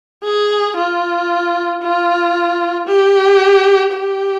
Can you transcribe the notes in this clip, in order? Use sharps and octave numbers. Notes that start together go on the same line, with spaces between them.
G#4
F4
F4
G4
G4